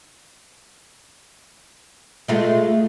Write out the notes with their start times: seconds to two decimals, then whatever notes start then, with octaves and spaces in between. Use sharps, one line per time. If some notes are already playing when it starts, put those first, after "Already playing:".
2.28 G#3 A3 F4